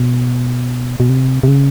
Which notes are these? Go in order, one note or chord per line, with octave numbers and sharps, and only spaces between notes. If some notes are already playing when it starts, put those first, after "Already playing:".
Already playing: B2
B2
C3
C3
C#3